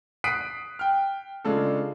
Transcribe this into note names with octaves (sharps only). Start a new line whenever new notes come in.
D#6 F#6 B6 C7 D7 D#7
G5 F6
C#3 G#3 D4 F4 A4